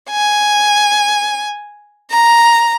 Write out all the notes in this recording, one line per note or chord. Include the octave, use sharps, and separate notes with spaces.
G#5
A#5